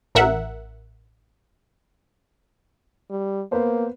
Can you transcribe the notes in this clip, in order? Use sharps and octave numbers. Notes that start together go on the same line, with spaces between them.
A1 A#4 E5 F#5
G3
A#3 B3 B4 C5